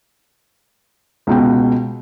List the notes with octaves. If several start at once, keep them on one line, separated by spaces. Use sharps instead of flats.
C#2 B2 G5